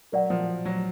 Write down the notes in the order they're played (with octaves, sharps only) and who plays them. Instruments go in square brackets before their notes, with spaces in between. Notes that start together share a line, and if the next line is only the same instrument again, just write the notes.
[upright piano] F#3 [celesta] A#4 D5 F#5
[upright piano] F3
F#3